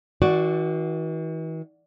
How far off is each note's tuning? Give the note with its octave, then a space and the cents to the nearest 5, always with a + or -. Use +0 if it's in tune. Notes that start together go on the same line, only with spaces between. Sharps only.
E3 -45 F#4 +0 D5 +0